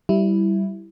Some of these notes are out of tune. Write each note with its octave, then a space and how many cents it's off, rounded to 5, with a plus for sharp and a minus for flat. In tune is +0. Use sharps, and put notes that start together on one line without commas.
G3 -15 E4 +0